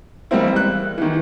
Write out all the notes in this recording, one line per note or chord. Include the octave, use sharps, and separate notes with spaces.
E3 G3 G#3 A#3 C4 E4
F#6
D#3 E3